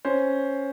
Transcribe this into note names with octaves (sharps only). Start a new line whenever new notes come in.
C#4 C5